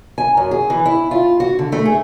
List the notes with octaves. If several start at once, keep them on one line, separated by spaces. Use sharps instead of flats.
G#5
F#2
G#4
E3
E4
F4
F#4
D3
A3
G#4